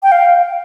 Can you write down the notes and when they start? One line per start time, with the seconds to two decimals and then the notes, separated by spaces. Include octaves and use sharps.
0.03 G5
0.12 F5